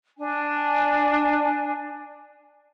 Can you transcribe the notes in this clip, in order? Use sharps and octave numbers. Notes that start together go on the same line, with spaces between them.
D4 G#5